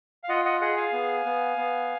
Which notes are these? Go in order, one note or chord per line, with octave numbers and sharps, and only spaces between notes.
F5
F4 D#5 F#5
D#5 F#5
G#4 D#5 F#5
F5 G#5
B3
B3
B3